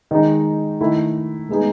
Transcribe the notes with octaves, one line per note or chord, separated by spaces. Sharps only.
D#3 G#3 D#4
D#3 A3 E4 A4
A2 G#3 B3 D#4 G#4